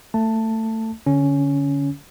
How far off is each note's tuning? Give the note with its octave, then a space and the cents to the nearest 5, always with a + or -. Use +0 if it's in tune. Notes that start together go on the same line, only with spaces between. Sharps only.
A3 +20 A5 +10
D3 -15 C#4 +10